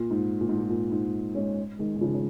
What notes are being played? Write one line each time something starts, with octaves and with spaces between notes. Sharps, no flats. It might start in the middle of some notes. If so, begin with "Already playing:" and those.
Already playing: A#2
G#2
A#2
G#2
A#2
A#2
G#2
G#3 C#4
D#3 G#3
D#3
C#3 F3
C#3